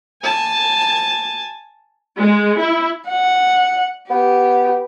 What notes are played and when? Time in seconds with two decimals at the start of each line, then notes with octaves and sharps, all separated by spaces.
0.24 G#5 A5
2.17 G#3
2.59 E4
3.09 F#5
4.10 B3 G4